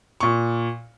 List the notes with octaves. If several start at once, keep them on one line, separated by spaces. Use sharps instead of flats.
A#2 C#6